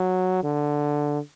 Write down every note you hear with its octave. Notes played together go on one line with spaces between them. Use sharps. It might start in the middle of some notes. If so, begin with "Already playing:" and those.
Already playing: F#3
D3